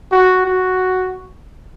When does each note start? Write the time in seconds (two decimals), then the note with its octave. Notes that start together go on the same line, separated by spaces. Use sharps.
0.12 F#4
0.46 F#4